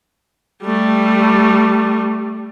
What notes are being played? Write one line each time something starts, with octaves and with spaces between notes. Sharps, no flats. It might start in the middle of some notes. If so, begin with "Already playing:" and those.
G3 A3